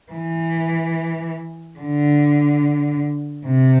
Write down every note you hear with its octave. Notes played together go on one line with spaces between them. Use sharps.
E3
D3
C3